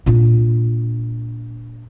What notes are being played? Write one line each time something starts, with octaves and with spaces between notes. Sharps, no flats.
A#2 D4